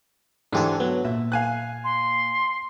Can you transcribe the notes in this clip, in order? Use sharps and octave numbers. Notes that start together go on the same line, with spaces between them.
G#2 D3 E3 D4 G4 A4
F#3 B3
A#2 E5
F5 G#5 F#6
C6